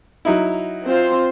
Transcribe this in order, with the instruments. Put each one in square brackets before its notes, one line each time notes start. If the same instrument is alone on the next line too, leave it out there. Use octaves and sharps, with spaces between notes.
[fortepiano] F#3 D#4 E4
[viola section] C4 F4 C5